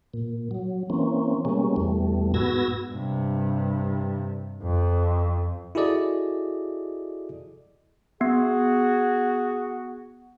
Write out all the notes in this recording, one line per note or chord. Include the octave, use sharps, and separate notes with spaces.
A#2
F#3
E3 A#3 C4 C#4
B2 G3 G#3 A#3 C#4
E2 B2 G3 A3
G#2 B3 F#4 E6 G#6 A#6
G2 C3
F2
E4 F#4 G#4 A4 D5 D#5
B3 F#4 G#4